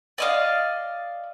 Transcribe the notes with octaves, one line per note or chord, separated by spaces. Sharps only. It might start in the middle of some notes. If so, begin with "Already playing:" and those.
D5 D#5 F5